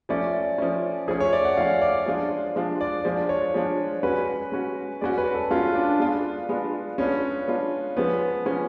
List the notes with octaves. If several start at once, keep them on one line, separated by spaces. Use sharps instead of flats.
F3 A3 C#4 D5
F3 A3 C#4
F3 A3 C#4 G#4
C#5
D5
F#5
F3 A3 C#4 F5
D5
F3 G#3 D4 F4
F3 G#3 D4 F4
D5
F3 G#3 D4 F4
C#5
F3 G#3 D4 F4
G#3 C#4 F#4 B4
G#3 C#4 F#4
G#3 C#4 F#4 D5
B4
A4
G#3 C#4 F4 F#4
D4
G#3 B3 D4 F4
G#3 B3 D4 F4
G#3 B3 C#4 D4 F4
G#3 B3 D4 F4
F3 G#3 B3 C#4
F3 G#3 C#4